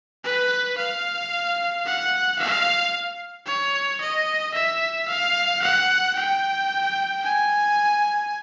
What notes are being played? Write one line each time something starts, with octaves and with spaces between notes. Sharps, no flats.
B4
F5
F#5
F5
C#5
D#5
E5
F5
F#5
G5
G#5